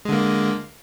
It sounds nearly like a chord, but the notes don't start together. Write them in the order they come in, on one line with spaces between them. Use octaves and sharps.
G#3 D3 A#3